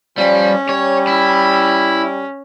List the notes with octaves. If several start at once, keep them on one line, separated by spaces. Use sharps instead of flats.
F3 G3 C#4
G3 C#5
E4